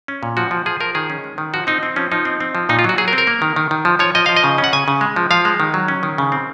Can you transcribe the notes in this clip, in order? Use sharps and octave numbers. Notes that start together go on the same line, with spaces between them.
C#4
A#2
F3 F#4
F3
F3 G#4
F3 A#4
D#3 G#4
C#4
G#3
D#3
F3 F#4
C4 D#4
C4
F3 C#4
F3 D#4
C4
C4
F3
A#2 D#4
F4
F#3
F#4
F#3 G#4
A#4
C4
A#4
A#3
D#3
D#3
D#3
F3
F3 C#5
F3 D#5
F3 F5
D#5
C#3
C#4
F#5
C#3 G#5
C#3
G#3
F3
F3 F5
G#3
D#3
F#3
C#4
D#3
C#3
C4